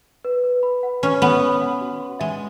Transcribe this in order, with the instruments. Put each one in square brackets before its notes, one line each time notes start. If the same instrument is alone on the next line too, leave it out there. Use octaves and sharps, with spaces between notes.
[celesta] B4
B4
B5
F#5
[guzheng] C#4 [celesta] B4
[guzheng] B3 [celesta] B4
[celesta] B5
F#5
F#4
F#4
[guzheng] G#3 [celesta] E5